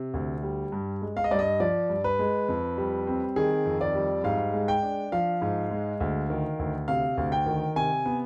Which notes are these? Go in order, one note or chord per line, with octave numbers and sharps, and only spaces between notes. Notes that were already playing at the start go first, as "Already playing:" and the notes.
Already playing: C3
D2
G3
G2
G#3
F5
D#5
G2 D5
D#5
F3 D5
G2
B4
G#3
F2
G3
C4
D#3 G#4
F2
D5
G3
G#2 F5
G#3
G5
D4
F3 F5
G#2
G#3
D2
D#3
D2
C3 F5
D2
G5
D#3
C3 G#5
B3